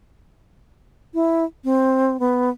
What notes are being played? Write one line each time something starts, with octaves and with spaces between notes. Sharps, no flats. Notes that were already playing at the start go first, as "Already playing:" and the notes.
E4
C4
B3